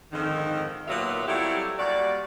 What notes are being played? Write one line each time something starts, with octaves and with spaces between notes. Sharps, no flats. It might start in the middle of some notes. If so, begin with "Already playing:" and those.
F2 G#2 D3 D#3
D#2 A#2 F#3 B3 E5 F5
F#3 G3 A3 C4 E4 G4
A#2 G3 F#4 D5